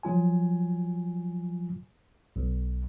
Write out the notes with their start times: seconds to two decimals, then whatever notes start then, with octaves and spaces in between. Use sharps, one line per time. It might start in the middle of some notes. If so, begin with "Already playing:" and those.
0.03 F3 F#3 F4 G#5
2.36 B1